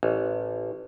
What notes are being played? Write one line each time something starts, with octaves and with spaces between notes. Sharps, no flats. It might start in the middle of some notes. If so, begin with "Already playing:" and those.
A1